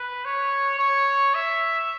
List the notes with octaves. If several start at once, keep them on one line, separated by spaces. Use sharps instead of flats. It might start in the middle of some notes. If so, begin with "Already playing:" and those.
Already playing: B4
C#5
C#5
E5